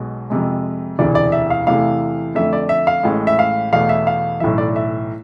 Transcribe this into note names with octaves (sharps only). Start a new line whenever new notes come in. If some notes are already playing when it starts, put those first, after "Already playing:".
Already playing: B1 B2 G#3
F2 C3 G#3
E1 D2 C3 E3 D5
D5
E5
F5
E2 C3 E3 A3 F5
F2 D3 A3 E5
D5
E5
F5
A1 A2 G#3
E5
F5
E2 B2 A3 F5
E5
F5
B1 A2 E3 E5
D5
E5